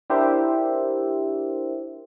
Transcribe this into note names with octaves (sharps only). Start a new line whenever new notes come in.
D4 E4 G4 A#4 C5 E5